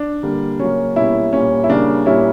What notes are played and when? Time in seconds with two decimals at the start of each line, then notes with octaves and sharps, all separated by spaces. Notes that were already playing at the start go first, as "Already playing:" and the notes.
Already playing: D4
0.23 D3 G3 A#3
0.59 C#3 F#3 A#3 C#4
0.96 B2 G3 A#3 C#4 E4
1.32 A#2 G3 A#3 C#4
1.64 E4
1.69 C#3 G3 A#3 D4
2.06 A#2 G3 A#3 C#4 E4